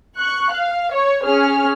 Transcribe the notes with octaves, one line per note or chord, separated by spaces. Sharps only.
C#6 F#6
F5
C#5
C#4 G#4 F6